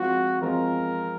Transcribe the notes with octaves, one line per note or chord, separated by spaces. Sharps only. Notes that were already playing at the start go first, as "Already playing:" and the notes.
Already playing: F3 G#3 C4 F4 F#4
F3 G#3 C4 F4 A#4